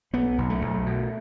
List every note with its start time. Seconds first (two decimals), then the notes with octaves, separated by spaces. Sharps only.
0.13 B1 B3
0.38 B1
0.50 A3
0.62 B1
0.86 B2